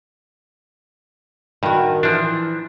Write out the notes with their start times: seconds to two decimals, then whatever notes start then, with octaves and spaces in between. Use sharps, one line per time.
1.63 G2 D#3 F#4
2.03 E3 F3 D4